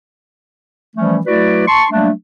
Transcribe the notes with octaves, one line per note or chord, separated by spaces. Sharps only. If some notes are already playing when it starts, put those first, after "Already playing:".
E3 F3 G3 A3 C#4
F#3 A3 E4 F#4 B4 D5
A5 C6 C#6
F#3 G3 A3 A#3 D4